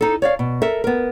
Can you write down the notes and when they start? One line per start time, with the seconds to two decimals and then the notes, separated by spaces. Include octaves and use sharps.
0.01 D#4 A4
0.22 C#5 D5 F5
0.39 B2
0.62 A4 A#4 E5
0.84 B3 A#4